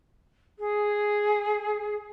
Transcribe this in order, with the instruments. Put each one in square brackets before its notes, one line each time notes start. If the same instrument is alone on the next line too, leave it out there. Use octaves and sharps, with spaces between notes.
[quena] G#4